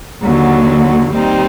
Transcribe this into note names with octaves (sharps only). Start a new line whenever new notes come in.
D#2 D3 F#3
D#2 D#3 G3 C4 D#4